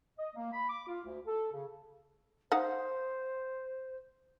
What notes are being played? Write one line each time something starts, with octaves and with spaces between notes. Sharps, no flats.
D#5
A#3
B5
D6
F4
D2
A4
C#3
D#4 C5 F5 F#5